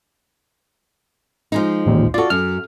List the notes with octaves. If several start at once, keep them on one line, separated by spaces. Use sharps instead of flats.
F3 G#3 D#4
A1 D#2 A#2
F4 F#4 A4 D5
F#2 F6